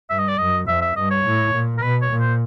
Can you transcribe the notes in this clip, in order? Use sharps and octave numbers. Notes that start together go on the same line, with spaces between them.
G2 E5
D#5
D5
F#2 D#5
F2 E5
E5
G2 D#5
C#5
A2
A#2
A#4
B2 B4
C#5
A#2
C5